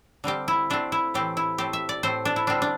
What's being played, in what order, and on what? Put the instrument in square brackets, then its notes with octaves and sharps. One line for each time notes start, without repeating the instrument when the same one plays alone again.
[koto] D3 G3 C4 G4
E4
D3 A3 C4 D4
E4
A2 E3 A3 C4 G4
E4
A2 A3 C4 G4
E5
D5
A2 A3 C4 C5
D4
E4
D3 G3 C4 D4
D4